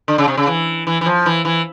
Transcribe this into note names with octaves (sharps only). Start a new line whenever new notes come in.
D3
C#3
C3
C#3
E3
E3
E3
F3
E3
E3